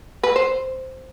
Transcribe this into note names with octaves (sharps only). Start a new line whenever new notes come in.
B4
C5